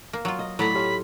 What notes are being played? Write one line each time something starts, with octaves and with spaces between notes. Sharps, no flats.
A#3
F#3 F4
D#5 F5
A2 F#3 A4 D5 A#5 B5
F4 G4 A4 C#5